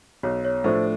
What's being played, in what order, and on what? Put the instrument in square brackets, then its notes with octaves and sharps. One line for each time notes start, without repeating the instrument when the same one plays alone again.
[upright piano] B1 [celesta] C#5
[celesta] C#5
[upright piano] A2 F3 A3 D4 [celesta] C5